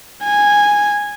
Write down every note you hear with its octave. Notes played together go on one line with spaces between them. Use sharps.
G#5